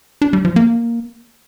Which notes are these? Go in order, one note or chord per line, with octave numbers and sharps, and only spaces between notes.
D4
G3
F3
A#3